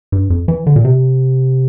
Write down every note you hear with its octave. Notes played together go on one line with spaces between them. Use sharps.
G2
F2
E3
D3
A#2
C3